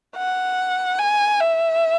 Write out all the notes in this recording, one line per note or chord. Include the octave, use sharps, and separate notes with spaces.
F#5
G#5
E5